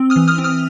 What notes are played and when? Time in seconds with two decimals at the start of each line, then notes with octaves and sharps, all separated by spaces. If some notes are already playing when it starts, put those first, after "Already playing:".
Already playing: C4
0.10 D#6 F6
0.16 E3
0.28 D#6 F6
0.38 C4
0.44 D#6 F6